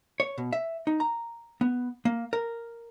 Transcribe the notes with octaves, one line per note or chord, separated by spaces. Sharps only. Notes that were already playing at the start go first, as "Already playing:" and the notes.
C#5
B2
E5
D#4
A#5
B3
A#3
A#4